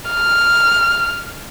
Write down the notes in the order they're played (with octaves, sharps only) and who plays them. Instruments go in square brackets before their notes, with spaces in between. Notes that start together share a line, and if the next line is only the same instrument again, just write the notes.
[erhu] F6